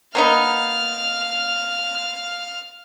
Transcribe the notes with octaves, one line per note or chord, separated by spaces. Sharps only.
A#3 B3 D#4 F5 F6